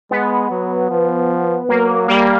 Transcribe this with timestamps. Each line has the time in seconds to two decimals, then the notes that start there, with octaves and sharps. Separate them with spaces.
0.11 G#3 B3
0.51 F#3
0.90 F3
1.69 F#3 A#3
2.08 G3 A#3